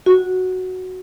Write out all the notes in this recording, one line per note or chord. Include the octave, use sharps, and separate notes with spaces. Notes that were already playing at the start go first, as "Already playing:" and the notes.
F#4